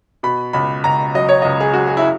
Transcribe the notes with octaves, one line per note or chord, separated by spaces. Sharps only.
B2 B5
C#2 B5
C#2 A#5
F#3 D#5
C#5
D#5
C#2
G#4
F#3 F#4
G#4
E4